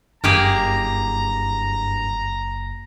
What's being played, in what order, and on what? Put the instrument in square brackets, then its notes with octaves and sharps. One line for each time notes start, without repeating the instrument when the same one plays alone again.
[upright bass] F#1 [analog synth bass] G2 [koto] A#3 G4 G#4 [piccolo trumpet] A#5